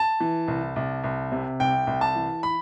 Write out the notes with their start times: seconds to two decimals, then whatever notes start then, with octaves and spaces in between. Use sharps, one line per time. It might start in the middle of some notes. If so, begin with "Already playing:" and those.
Already playing: A5
0.20 E3
0.48 C2
0.76 C2
1.04 C2
1.32 C3
1.60 C2 G5
1.87 C2
2.01 A5
2.16 E3
2.43 B5